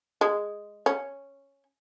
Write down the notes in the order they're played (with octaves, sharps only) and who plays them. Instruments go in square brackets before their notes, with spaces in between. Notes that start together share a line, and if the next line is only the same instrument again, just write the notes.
[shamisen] G#3
C#4